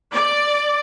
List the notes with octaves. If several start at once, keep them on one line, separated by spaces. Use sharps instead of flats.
D5